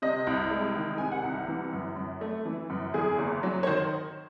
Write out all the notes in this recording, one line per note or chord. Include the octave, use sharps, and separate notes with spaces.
C3 D#5
C2
G#3
D#3
C3 G#5
F#5
C2
E3
F#2
F#2
A3
E3
F#2
E2 G#4
F#1
F#3
C#5
D#3 C5